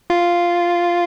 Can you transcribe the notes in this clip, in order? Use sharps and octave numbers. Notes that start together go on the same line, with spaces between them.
F4